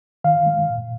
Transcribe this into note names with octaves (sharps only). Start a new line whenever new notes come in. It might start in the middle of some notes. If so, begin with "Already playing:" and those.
D#3 F5
G#3
A#2